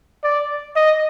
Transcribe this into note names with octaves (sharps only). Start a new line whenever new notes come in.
D5
D#5